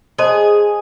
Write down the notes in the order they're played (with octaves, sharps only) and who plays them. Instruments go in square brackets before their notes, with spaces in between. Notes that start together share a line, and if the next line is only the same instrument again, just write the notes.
[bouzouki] G#4 [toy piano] C5 D#5 A5 C6